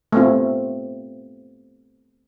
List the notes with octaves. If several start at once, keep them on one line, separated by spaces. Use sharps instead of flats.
A3 B3 C4 F4